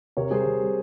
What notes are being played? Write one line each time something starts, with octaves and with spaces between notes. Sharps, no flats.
C3 A#4 C#5
G3 G#4 C5
C3
G3